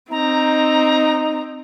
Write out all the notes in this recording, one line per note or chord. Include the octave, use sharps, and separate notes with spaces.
C4 D#4 A#5